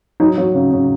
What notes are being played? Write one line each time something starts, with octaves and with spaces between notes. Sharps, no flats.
F#3 D#4
F#3
C#3
C#3